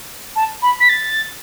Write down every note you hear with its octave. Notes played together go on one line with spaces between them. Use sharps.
A5
B5
B6
A6